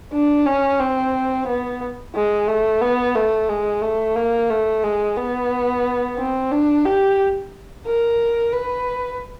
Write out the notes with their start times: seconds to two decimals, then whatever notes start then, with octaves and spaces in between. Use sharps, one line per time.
0.12 D4
0.46 C#4
0.80 C4
1.47 B3
2.15 G#3
2.48 A3
2.81 B3
3.15 A3
3.49 G#3
3.82 A3
4.15 A#3
4.49 A3
4.83 G#3
5.17 B3
6.17 C4
6.51 D4
6.85 G4
7.86 A#4
8.53 B4